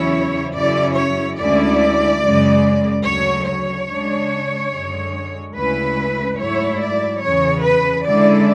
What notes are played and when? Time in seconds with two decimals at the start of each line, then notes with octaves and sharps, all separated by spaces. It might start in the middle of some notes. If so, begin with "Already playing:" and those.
Already playing: E2 C#3 F#3 C#4 E4 C#5
0.53 F#2 C#3 F#3 C#4 E4 D5
0.95 C#5
1.37 D2 D3 G#3 C#4 E4 D5
2.21 F#2 C#3 G#3
3.03 D2 C#3 F#3 C#5
3.46 C#5
3.87 C#3 G#3 D4
4.71 F#2 D3 G#3
5.55 D2 C#3 G#3 C#4 E4 B4
6.38 G#2 F#3 A3 E4 C#5
6.80 D5
7.21 E2 C#3 E3 C#5
7.63 B4
8.05 D3 G#3 C#4 E4 D5